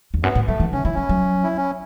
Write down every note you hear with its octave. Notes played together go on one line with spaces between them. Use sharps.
E2
F#2 B3
A2
F#3 A3
E3
C#3 C#4
E3 E4
F#3 C#4
F#3
E4
C#4